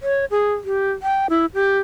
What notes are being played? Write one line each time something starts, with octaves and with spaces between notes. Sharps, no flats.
C#5
G#4
G4
G5
E4
G4